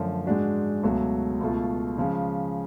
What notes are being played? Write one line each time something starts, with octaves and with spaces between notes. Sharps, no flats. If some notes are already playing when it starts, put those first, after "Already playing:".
Already playing: F#2 D3 F3 A3 C#4
G#2 G#3 D4 F#4
C#2 B2 F#3 A3
C#2 B2 A3 F4
C#3 F3 G#3